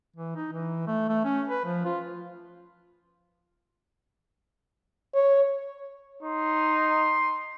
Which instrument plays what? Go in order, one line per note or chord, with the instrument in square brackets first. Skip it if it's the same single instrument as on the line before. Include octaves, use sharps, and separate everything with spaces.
[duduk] E3
D#4
E3
A3
A3
C#4
B4
F3
F4
[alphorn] C#5
[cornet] D#4 [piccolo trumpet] C6